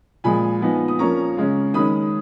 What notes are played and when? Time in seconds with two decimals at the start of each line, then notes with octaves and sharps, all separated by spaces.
0.24 A#2 F3 G#3 G#5 B5
0.61 F3 B3 D#4
0.88 D#6
0.99 F3 A#3 C#4 A#5 C#6
1.37 C#3 G#3 C#4
1.74 D#3 G#3 C#4 B5 D#6